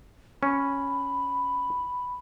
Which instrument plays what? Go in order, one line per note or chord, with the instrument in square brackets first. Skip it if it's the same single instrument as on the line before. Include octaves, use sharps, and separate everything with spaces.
[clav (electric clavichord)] C#4 [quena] B5